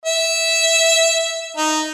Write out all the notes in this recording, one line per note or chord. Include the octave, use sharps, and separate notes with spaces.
E5
D#4